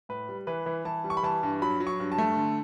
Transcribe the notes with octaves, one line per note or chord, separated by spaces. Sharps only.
A2 B4
G3
E3 B4
E3
E3 A5
G3
C#6
B5
E3 A5
G2
F#3 B5
F#3
C#6
G2
A5
A3
D3